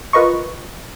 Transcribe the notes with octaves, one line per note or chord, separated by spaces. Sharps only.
F4 A#4 B4 D#5 C#6